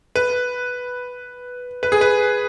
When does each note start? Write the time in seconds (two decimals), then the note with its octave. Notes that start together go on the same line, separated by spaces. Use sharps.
0.15 B4
1.83 B4
1.92 G#4
2.01 B4